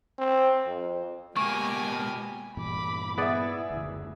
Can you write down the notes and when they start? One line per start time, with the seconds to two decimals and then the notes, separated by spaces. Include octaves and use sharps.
0.19 C4
0.67 F2
1.37 B2 G#3 A#3 G4 G#5 C#6
2.57 G2 A#2 E3 B5 D6
3.18 B3 E4 G#4 D5 E5
3.70 F#1 D2